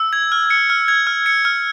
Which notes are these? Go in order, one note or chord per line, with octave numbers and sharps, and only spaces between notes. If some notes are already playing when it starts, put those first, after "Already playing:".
Already playing: E6
G#6
F6
C#7
F6
G#6
F6
C#7
F6